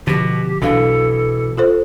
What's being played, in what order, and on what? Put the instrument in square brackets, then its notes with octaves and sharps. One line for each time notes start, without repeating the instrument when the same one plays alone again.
[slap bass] B2 [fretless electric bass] D3 F3 [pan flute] G4
[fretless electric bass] B1 [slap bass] B2 E3 [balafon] D4 F5 [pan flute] A4
[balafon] F4 A4 C5